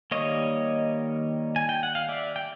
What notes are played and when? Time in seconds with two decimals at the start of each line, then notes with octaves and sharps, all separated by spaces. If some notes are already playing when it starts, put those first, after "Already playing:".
0.11 D#3 G3 A#3 C#5 D#5
1.56 G#5
1.69 G5
1.83 F#5
1.95 F5
2.09 D5 E5
2.36 G5